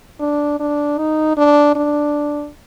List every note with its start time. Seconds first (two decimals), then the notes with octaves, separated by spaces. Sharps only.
0.20 D4
0.60 D4
0.98 D#4
1.37 D4
1.75 D4